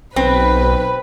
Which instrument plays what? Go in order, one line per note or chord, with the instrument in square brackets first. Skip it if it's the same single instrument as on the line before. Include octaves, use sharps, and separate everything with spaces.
[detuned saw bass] B1 [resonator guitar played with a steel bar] C4 [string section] B4